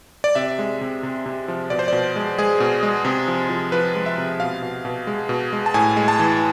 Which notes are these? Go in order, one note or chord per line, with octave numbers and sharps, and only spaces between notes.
D5
C3 E5
G#3
C3
C3
C3
F3
B2 D5
C5
B2 D5
G#3
G#3 G#4
B2
G#3
C3
F3
F3
F3 B4
G#3
E5
C3
B2 F5
B2
B2
G#3
B2
G#3
A5
A2 G#5
G#3
A5
E3